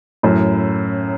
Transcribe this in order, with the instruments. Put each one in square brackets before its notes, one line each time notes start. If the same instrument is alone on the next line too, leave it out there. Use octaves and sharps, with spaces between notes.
[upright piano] F#2 A2